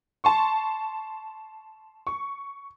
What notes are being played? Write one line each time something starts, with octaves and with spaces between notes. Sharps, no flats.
A5 C6 C#6
C#6